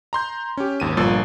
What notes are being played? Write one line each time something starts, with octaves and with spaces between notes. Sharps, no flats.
A#5 C6 G6
C#4 G4
G#1 D#2 D#7
G1 A#2 F3 F4 E6 A6